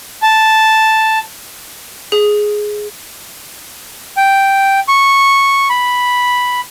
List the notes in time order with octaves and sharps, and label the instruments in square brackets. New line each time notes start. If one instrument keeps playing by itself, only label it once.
[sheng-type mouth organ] A5
[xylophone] G#4
[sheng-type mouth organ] G5
C#6
B5